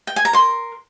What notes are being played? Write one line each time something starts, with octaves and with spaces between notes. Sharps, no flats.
G5
G#5
A#5
A#4 C6